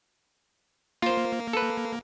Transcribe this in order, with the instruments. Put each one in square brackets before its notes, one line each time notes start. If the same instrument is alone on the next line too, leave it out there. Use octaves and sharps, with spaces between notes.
[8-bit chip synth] A#3 [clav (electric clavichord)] F4 C5
[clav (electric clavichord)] A4 B4